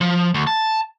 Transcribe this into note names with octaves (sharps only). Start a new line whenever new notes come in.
F3
D2
A5